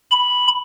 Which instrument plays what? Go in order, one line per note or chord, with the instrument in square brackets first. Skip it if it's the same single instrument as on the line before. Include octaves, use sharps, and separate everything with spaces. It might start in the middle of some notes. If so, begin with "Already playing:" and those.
[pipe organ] B5